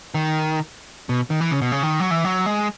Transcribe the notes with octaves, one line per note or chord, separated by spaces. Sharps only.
D#3
B2
D#3
E3
C#3
B2
C#3
D#3
F#3
E3
F#3
G#3